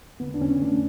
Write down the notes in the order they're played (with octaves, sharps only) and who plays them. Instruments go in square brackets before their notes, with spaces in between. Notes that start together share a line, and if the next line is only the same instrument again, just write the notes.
[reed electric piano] D3 B3
D4
D3 C#4
A3 D4